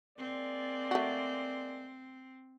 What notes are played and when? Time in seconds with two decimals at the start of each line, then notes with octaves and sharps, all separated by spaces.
0.18 G#3 A#3 C4 D5
0.91 A3 F#4